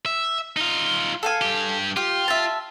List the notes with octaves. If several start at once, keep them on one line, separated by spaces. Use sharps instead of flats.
E5
D#4 F4
A4 F5 G#5
G2 G4
F4 G4
E5 A5